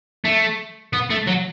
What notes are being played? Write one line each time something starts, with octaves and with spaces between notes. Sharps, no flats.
A3
B3
A3
F#3